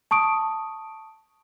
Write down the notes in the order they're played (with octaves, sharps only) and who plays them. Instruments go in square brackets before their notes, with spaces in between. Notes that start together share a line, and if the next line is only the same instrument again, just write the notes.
[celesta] A5 C#6 D#6 D7